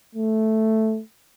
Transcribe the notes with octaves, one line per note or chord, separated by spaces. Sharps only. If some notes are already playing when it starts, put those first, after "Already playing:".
A3